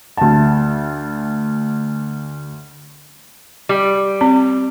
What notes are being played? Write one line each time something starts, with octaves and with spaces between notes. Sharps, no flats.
D2 A5
G3
C4